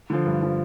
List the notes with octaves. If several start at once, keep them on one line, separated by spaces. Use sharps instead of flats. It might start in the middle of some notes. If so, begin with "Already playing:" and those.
D3 F3
G2
D3 F3